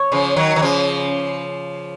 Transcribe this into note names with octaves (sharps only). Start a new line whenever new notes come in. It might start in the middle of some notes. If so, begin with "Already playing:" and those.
Already playing: C#5
C#3 F3
D#3 F#3
D#3
C#3 F3